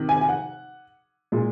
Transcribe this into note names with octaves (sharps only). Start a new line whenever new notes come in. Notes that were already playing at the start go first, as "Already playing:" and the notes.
Already playing: C3 D#3
G#5
G#5
F#5
A#2 G#3